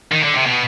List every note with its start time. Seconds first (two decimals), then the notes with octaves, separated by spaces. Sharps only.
0.12 D#3
0.23 D3
0.34 C3
0.46 B2